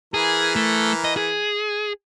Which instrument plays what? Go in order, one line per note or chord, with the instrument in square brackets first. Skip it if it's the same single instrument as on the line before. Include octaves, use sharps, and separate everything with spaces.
[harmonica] E3 A#4 [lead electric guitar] G#4
[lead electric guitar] A3
D#5
G#4